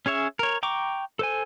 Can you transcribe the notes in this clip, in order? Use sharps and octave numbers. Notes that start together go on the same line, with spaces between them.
C#4 G#4 C#5 E5
A#4 C#5
G5 A#5 C#6 D6
A4 C5 G#5